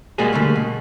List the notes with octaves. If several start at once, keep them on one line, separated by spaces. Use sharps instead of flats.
B2 G3 G#3 A#3 F#4 G#4
D3 G3 A3 A#3
B2